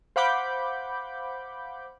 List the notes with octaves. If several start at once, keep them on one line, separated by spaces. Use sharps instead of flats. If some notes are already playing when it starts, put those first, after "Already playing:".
C5 F5 F#5 B5 D6 G6